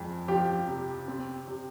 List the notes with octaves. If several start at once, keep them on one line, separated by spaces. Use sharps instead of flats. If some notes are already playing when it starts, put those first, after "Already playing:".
Already playing: F2 G#3
F3 G4
C3
C4
C3